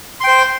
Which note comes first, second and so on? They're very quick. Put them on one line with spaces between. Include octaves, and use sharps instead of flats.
C6 G5 C5